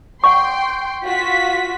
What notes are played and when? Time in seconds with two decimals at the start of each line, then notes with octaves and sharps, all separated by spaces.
0.24 F#5 G5 C6 C#6
1.05 F4 F#4 B6